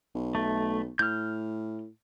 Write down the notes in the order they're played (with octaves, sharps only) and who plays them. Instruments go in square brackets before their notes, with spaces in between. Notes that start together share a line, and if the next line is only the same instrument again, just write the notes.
[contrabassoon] B1
[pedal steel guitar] A3
[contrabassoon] A2 [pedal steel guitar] F6 G6